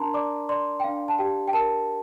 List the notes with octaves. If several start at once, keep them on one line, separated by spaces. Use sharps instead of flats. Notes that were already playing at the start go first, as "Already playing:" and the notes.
Already playing: D4 A#4 A5 A#5 C6
D5 D6
D5 C6
G5
D4 F5
A5
G4 G5
G5
A#4 A5